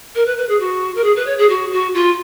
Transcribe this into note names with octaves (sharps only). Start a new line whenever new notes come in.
A#4
B4
B4
G#4
F#4
A#4
G#4
B4
C#5
G#4
F#4
F#4
F4